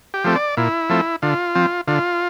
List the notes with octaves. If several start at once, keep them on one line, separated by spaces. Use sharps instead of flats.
G4
F3 A3 C4
D5
A#2 E4
F3 A3 C4
D3 F4
F3 C4
D3 F4